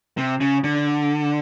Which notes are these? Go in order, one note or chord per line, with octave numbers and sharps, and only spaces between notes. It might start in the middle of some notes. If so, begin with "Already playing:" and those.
C3
C#3
D3